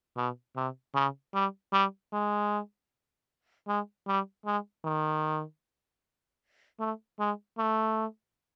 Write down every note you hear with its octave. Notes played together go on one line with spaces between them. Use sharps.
B2
C3
C#3
G3
G3
G#3
G#3
G3
G#3
D#3
A3
G#3
A3